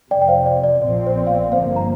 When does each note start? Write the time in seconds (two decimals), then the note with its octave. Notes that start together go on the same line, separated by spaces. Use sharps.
0.11 F2 C3 F3 D5 G5
0.22 G5
0.28 C5 F5
0.46 D5
0.64 D5
0.81 A#1 A#2 F3 C4 D5
1.07 C5
1.18 D5
1.27 F5
1.35 D5
1.52 G1 G2 F3 A#3 C5 F5
1.76 A#5